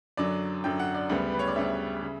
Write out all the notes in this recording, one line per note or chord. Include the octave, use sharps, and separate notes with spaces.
F#2 D3 F#3 D5
F#2 D3 F#3 G5
F#5
D5
D2 C#3 G3 B3
B4
C#5
D5
D2 C#3 G3 B3 E5
C#3